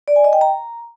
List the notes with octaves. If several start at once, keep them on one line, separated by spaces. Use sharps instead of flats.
D5
G#5
D#5
G5
A#5